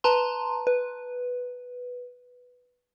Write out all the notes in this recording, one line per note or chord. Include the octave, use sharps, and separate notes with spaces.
B4 A5 A#5 C6
B4